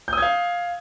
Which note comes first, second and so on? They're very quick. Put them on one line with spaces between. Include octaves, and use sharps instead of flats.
G6 D#6 G#6 F5